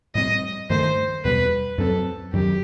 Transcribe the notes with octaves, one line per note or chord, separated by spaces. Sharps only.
A2 G3 C4 D#5
G2 D#3 A3 C5
E2 B2 G3 B4
F#2 F#3 C4 A4
F#2 D#3 F#3 G4